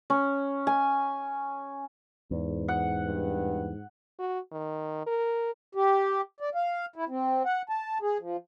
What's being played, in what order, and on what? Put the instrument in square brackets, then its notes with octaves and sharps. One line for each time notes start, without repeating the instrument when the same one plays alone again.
[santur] C#4
G#5
[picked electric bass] E2 [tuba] G#2
[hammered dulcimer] F#5
[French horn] G2
[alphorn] F#4
D#3
A#4
[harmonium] G4
D5
F5
E4
C4
F#5
A5
G#4
F3